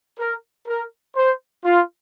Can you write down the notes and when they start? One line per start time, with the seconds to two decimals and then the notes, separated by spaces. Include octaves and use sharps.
0.19 A#4
0.67 A#4
1.16 C5
1.65 F4